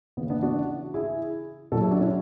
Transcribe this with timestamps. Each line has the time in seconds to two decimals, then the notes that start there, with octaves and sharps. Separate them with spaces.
0.17 C#3 B3
0.21 E3
0.30 B3 D4
0.43 D4 F#4
0.94 E4 G#4
1.72 B2 F#3 F#4 A4
1.81 E4 G#4
1.91 D4 F#4
2.01 C#4 E4